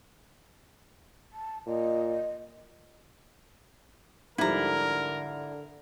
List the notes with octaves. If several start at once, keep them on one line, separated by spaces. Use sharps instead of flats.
A5
A#2 D#5
G#2 D3 F3 G3 E4 A#4 A#5